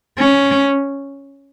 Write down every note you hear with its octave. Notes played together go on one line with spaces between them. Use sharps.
C#4